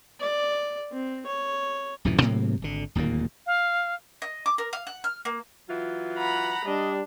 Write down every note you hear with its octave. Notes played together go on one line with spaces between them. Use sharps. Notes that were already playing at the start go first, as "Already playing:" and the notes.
D5
C4
C#5
D1 F#2 A#2 E3
G#2 C3 F#3 A#3
G#1 D3
D1 D#2 A#2 A#3
F5
D#5
D6
A#4
F5
F#5
F6
A#3
E3 F#3 F4
F#5 A#5 B5
G3 D4 D#5